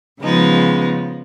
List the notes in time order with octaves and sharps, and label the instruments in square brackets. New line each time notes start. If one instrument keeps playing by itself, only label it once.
[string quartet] C#3 F3 G#3 B3 D#4